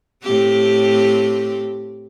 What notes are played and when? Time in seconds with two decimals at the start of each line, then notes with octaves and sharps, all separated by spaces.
0.23 A2 C4 G4